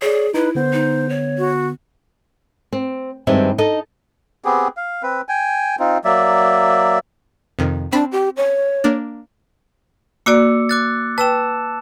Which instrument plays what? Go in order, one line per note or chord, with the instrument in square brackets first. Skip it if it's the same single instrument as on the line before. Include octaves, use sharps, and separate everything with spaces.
[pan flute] G#4 [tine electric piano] C#5 D5
[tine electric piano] D#4 [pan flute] E4 [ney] B4
[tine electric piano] D3 B3 [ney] C5
[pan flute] D#4
C#5
[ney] F#4
[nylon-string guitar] C4
G2 D#3 G3 G#3 C4 E5
D#4 A4 D#5
[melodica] B3 C4 G4 G#4
F5
C4 B4
G5 G#5
C4 D#4 F4
F#3 A#3 D5 E5
[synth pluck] F2 C3 D#3
[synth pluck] C4 B5 [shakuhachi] D4
[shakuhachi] G4
C#5
[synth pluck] A#3 D4
[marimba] A#3 F#4 D5 [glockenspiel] D6 E6 C#7
[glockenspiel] D6 F#6 A6
[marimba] B4 G5 [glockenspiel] A5 E6 E7